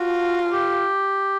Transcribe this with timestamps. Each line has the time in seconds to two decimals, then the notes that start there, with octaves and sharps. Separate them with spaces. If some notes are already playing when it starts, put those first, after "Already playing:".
Already playing: F4 F#4
0.52 G4